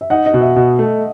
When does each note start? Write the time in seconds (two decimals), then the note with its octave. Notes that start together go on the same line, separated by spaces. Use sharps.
0.01 E5
0.10 D#4 F#5
0.26 D#5
0.34 B2
0.41 E5
0.56 B2
0.79 A3